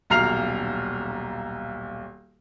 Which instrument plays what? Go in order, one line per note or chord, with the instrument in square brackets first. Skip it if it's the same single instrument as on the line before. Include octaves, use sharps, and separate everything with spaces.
[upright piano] D#1 B1 A#5 F6 C7 F7